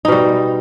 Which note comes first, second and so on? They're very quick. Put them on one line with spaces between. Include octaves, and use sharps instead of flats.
D#4 B2 G3